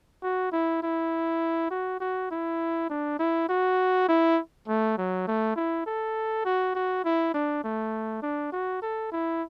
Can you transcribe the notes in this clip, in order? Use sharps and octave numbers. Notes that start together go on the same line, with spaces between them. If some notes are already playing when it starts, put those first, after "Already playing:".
F#4
E4
E4
F#4
F#4
E4
D4
E4
F#4
E4
A3
F#3
A3
E4
A4
F#4
F#4
E4
D4
A3
D4
F#4
A4
E4